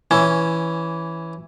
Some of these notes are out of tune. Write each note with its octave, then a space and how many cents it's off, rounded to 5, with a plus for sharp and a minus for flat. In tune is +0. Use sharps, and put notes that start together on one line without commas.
E3 +0 C#4 +0